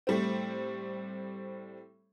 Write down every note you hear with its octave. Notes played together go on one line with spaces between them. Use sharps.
A2 G3 C4